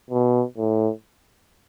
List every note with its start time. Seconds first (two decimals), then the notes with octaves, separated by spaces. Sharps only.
0.11 B2
0.57 A2